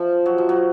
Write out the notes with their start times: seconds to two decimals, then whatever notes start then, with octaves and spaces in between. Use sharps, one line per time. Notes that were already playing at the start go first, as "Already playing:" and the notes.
Already playing: F3
0.26 F#3
0.38 F3
0.49 F#3